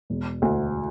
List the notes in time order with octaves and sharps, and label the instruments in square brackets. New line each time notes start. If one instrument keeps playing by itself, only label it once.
[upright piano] E1
D2